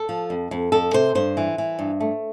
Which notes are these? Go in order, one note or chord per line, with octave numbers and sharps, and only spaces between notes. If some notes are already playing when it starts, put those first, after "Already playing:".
Already playing: A4
F3
F2
F2
F2 A4
C3 C5
G2 C5
E3
E3
G2
A3